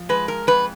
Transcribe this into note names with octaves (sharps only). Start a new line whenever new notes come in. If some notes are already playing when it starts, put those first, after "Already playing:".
Already playing: F3
G#3 B4
A#4
F2 B4